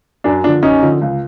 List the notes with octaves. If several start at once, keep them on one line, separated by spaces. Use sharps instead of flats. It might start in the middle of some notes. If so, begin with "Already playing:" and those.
F#2 D4
D3 F3 D4
F#2 C#4 D#4
D3 F3
C#2